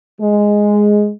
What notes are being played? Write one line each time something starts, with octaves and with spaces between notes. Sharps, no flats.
G#3